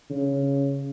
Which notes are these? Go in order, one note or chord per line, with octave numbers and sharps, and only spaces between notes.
C#3